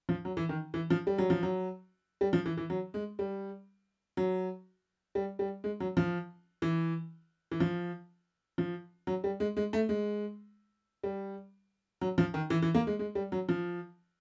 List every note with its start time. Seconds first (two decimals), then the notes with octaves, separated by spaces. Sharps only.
0.09 F3
0.25 F#3
0.37 E3
0.49 D#3
0.74 E3
0.90 F3
1.07 G3
1.18 F#3
1.30 F3
1.43 F#3
2.21 G3
2.33 F3
2.46 E3
2.57 E3
2.70 F#3
2.94 G#3
3.19 G3
4.17 F#3
5.15 G3
5.39 G3
5.64 G#3
5.80 F#3
5.97 F3
6.62 E3
7.51 E3
7.60 F3
8.58 F3
9.07 F#3
9.24 G3
9.40 G#3
9.57 G#3
9.73 A3
9.89 G#3
11.03 G3
12.01 F#3
12.18 F3
12.34 D#3
12.50 E3
12.62 E3
12.75 A#3
12.87 G#3
12.99 G#3
13.15 G3
13.32 F#3
13.49 F3